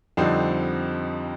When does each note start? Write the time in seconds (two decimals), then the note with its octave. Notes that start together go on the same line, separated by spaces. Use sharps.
0.17 F2 D3 G3 C4 D#4